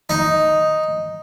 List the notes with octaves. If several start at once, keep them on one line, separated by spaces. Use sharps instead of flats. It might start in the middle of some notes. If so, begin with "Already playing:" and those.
D#4